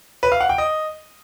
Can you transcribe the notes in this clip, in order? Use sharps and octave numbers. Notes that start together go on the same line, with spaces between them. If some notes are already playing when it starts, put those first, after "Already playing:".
B4
F5
F#5
G5
D#5